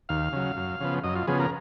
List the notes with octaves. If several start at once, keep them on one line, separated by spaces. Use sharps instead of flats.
D#2 F5
C#3 F#3
F#2
C#3 F3 B3
F#2 D#5
F4
C#3 F3 B3 G#4
A#4